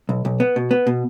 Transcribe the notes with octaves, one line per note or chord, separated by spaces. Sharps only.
B1
B1
B3
B2
B3
B2